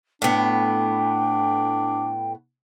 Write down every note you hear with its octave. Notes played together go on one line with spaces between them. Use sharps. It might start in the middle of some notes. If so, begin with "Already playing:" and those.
A2 B3 D4 G5